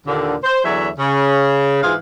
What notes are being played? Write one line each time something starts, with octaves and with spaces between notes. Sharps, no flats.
D#2 A#2 D3
C5
E2 D3 F#3 C#5 E5
C#3
G#2 E3 F4 G#4 F5